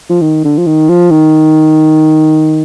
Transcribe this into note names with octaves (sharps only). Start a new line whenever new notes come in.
F3
D#3
D3
F3
D#3
F3
D#3